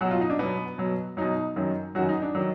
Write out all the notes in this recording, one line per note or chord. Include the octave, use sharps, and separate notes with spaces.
B2 F#3 F#4
F4
D#4
D4
B2 F#3 B3
B2 F#3
B2 F#3 D#4
F#2 D#3 F#3
F#2 D#3 F#3 F#4
D#4
D4
D#3 F#3